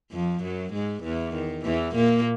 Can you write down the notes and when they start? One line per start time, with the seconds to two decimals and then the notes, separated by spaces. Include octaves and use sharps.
0.12 F2 F3
0.43 F#2 F#3
0.73 G#2 G#3
1.03 E2 E3
1.34 D#3
1.64 E2 E3
1.95 A#2 A#3